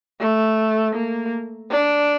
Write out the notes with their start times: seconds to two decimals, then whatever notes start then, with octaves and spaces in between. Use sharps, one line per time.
0.20 A3
0.95 A#3
1.71 D4